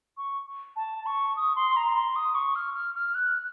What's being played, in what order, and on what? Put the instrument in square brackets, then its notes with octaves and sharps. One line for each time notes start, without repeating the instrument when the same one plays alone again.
[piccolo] C#6
A5
C#6
D#6
C6
A#5
C6
D#6
C#6
F6
F6
F6
F#6